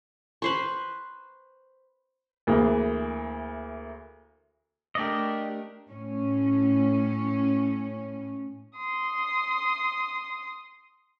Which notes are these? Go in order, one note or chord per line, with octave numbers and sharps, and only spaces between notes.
B4 C5 C#6
D2 E3 A#3 G#4
A3 D4 G4 A#4 D5 D#5
A2 C#4
C6 D#6